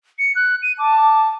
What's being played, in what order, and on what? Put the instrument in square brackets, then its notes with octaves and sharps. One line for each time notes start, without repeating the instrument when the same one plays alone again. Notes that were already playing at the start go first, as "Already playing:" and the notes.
[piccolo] C#7
F#6
D#7
[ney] A5 [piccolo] D6
[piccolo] D6